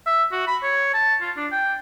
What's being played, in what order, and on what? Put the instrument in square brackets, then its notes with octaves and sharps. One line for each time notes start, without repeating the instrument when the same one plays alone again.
[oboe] E5
F#4
B5
C#5
A5
F4
D4
G5